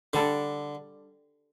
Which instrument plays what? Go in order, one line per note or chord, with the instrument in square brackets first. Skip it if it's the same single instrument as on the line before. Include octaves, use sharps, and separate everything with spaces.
[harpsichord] D3 [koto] G3 D4 A4 D5